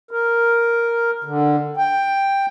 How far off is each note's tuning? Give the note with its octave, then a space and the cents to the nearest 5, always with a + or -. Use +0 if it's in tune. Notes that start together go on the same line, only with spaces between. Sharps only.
A#4 +0
D3 +10
G5 +5